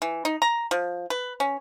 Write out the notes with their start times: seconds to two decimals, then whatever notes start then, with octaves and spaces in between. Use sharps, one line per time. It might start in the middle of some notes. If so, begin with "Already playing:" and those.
0.02 E3
0.25 D#4
0.42 A#5
0.71 F3
1.10 B4
1.40 C#4